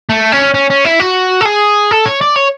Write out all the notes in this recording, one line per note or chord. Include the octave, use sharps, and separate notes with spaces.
A3
C#4
C#4
C#4
E4
F#4
A4
G#4
A4
C#5
D5
C#5